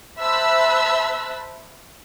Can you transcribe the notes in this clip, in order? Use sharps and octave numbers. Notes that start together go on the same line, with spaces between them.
C5 E5 A5 B5 E6 F#6